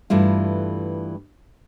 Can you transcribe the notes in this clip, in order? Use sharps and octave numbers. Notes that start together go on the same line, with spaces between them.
G2 E3 A3 F4